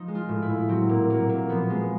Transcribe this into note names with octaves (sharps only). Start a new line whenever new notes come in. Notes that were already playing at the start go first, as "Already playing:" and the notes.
Already playing: F3 D#4
G#3
F4
A2
E4
A2
F#3 C4
A#2 A#3
F#3 A#3
A#2 A#3
F3 B3
G#3